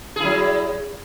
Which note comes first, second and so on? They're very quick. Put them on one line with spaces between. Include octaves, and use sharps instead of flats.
G#4 E4 F#3